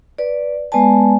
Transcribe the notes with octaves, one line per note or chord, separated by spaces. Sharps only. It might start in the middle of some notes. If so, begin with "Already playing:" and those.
B4 D5
G#3 B3 B4 D5 G#5 A5